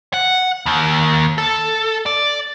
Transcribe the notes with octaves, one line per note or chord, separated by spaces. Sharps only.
F#5
D#2
A4
D5